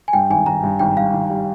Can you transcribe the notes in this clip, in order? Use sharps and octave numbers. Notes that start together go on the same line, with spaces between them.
G#5
G2 G5
G#1 G#5
G#1 A#5
G2
G#1 G5
G2 F5
D#3
G3